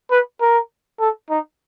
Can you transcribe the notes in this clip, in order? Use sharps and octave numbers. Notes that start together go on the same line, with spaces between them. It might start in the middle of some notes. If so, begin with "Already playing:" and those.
B4
A#4
A4
D#4